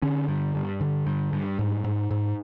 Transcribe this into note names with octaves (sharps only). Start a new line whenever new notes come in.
D3 C#4
G2
G2
D3
G2
G2
G#2
G#2
G#2